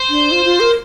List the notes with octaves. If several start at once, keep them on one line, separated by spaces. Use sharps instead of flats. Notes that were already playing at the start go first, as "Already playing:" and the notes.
Already playing: C5
D4
F4
F4
A#4